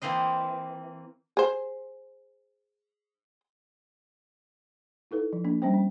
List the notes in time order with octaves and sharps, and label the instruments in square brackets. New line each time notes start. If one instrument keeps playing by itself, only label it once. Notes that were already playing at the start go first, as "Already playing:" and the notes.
[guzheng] E3 A#3 C4 C5 D#5
[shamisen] G#4 C5
[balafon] D#4 E4 A4 B4
F3
F3 A#3 D4
G3 C4 C#4 C5 G5
C#4